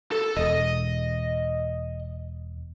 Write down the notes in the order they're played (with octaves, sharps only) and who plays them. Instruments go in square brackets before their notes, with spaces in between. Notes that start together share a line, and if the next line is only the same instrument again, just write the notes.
[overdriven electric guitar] A4
[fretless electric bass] E1 [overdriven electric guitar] D#5